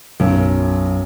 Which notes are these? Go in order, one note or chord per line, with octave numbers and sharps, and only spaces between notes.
B1 F#2